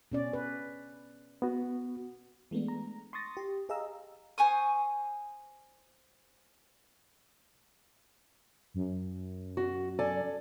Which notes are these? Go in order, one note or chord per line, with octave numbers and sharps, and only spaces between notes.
B2 C#4 D5
B4
B3 F#4
E3 G#3 A3 B3 D4
A#5
C6 C#6 D#6 A6 A#6
G4
G4 G#4 D#5 F5 A#5 E6
C5 G#5 C#6 D#6
F#2
F#4
A4 D5 G#5